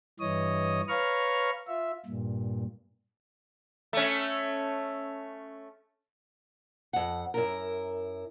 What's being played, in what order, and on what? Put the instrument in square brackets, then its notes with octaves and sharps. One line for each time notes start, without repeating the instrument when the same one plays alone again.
[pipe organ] G2 E3 C#5 D#5 D#6
B4 C#5 F5 A#5 C#6 F6
F4 E5
G2 A#2
[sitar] A3 C#4
[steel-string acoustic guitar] F2 F#5
F#2 E4 A#4